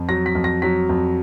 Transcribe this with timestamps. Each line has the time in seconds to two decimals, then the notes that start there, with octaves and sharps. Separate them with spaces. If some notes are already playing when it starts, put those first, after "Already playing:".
Already playing: F2
0.09 F#3 A#6
0.26 B6
0.35 F2
0.44 A#6
0.62 F#3 B6
0.89 F2